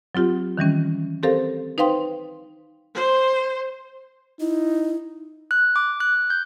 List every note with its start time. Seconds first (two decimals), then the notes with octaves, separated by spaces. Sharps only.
0.15 F#3 C4 F4 G4
0.58 D#3 E3 G3 C#4
1.23 C4 G4 A4 A#4 C5 F5
1.78 D#4 B4 C5 F5 G5 C6
2.94 C5
4.40 D#4 E4
5.51 F#6
5.76 D6
6.00 F#6
6.30 G6